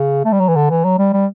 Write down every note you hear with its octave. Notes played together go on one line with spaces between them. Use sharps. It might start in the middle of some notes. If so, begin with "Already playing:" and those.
Already playing: C#3
A3
G3
F#3
E3
D3
E3
F#3
G3
G3